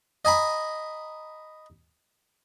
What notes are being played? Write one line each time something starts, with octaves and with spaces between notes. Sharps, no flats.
D#5 G#5 A#5 B5